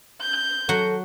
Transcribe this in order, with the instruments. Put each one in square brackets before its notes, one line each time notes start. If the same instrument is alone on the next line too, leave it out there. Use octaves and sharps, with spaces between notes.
[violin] G6
[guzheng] F#3 F#4 F#5 [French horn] A4